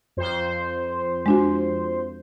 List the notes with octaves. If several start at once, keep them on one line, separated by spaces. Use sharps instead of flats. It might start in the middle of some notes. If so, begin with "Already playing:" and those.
F2 C5
G#3 D4 F#4